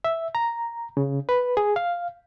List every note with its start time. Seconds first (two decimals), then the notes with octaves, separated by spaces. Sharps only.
0.04 E5
0.35 A#5
0.97 C#3
1.29 B4
1.57 G#4
1.76 F5